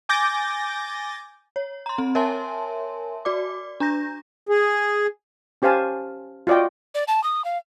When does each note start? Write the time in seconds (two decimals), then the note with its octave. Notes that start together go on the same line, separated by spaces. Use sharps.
0.09 G#5 D6 G6 A6 A#6
1.56 C#5
1.86 A#5 C6
1.98 C4
2.15 A#4 C#5 E5 G#5 A5 C6
3.25 F#4 D5 D6
3.80 D4 A#5 G6 A#6
4.49 G#4
5.62 C#4 G4 C5 F5 G#5 A5
6.47 F4 F#4 D5 D#5 G5
6.95 D5
7.08 A5
7.24 D#6
7.45 F5